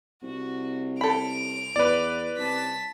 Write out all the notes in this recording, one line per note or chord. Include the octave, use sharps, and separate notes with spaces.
C2 F#4
A4 B5 D7 F7
E2 B4 D5
C2 A5 B6